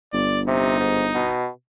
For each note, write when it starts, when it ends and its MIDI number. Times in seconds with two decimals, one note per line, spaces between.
0.13 1.31 31
0.13 0.40 74
0.47 0.76 48
0.47 1.43 63
0.80 1.06 44
1.15 1.47 47